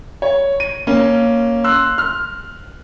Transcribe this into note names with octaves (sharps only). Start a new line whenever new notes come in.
C#5
D#7
A#3 C#4
C6 E6 F#6
F6